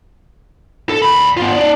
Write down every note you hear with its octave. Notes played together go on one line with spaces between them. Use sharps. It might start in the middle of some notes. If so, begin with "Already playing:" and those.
A4
D2 B5
B3 F4
D#4 D5